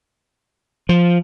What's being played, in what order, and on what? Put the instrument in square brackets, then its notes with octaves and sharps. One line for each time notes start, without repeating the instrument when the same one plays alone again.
[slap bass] F3